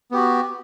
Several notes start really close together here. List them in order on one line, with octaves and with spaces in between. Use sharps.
B3 G4 F#4